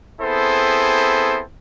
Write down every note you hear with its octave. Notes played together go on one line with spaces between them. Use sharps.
B3 C4 E4 G#4 A4 C5